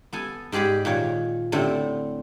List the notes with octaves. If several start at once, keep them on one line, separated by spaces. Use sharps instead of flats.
B3 A4 G#5
G#2 G4 G#4 D5 B5
A#2 D#3 C#5
A2 D3 A3 C4